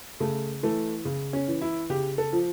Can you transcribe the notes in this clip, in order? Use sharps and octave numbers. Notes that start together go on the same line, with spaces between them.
C#3 A3
E3 A3
C#3
C#4
E3
E4
C#3 G4
A4
F3